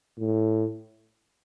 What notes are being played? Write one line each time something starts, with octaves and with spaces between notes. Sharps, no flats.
A2